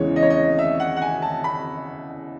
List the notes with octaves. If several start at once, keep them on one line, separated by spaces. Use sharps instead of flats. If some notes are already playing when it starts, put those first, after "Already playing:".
Already playing: E2 C#3 E3 G#3 C#5
D#5
C#5
D#5
E5
F#5
F#5
G#5
A5
B5